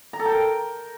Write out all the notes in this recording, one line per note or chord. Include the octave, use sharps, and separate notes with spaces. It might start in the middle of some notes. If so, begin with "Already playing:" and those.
A#5
A4
G5
A#4